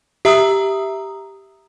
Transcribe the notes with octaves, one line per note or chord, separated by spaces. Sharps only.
G4 E5 A#5 D#6 E6